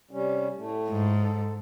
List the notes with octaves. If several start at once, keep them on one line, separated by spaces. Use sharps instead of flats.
C3 G3 C#4
A2 A3
G#2
A4